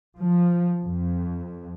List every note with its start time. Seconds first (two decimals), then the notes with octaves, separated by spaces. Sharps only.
0.17 F3
0.81 F2